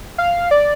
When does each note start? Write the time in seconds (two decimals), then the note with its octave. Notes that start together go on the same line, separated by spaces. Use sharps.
0.18 F5
0.51 D5